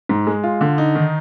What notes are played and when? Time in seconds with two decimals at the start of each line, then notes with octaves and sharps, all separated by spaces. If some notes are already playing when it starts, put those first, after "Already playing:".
0.09 G#2
0.27 G#3
0.44 F4
0.61 D3
0.78 D#4
0.95 D#3